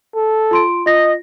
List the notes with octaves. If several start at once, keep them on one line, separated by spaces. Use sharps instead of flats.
A4
F4 C6 D7
F4 D#5 A#6